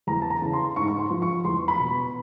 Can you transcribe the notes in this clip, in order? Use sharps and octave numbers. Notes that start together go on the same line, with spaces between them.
E2 A#5
A5
A#5
C#3 E3
C6
G#2 C#6
C#6
C6
F3
C#6
E2 C6
B5
B2